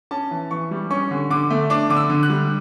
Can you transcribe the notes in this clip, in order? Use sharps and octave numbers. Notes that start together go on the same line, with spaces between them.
C#4 A5
E3
E3 C#6
G3
C#4 C#6
D3
D3 D6
A3
D4 D6
D3 D6
E6
D3
F#6
G3